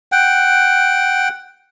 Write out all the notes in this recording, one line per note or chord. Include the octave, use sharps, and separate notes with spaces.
F#5 G5